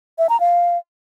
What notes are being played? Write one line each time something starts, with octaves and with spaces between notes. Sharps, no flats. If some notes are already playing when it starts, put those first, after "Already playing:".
E5
A#5
F5